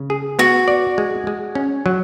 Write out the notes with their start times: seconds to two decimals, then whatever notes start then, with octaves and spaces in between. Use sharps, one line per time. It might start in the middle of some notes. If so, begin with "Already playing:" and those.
Already playing: C#3
0.10 G#4
0.39 B3 F#4
0.68 D5
0.98 G#3
1.27 G#3
1.55 C#4
1.86 F#3